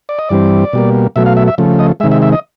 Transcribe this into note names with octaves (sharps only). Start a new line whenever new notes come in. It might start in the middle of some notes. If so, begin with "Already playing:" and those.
D5
D#5
G2 E3 G3 C4 D5
B2 G3 A#3
B2 F#3 A3 E5
F5
E5
E5
C#3 F3 A3
D#5
C3 D#3 G#3 E5
E5
E5
D#5